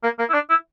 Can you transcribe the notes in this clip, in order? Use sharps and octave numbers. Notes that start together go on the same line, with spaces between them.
A#3
A#3
E4
D4
E4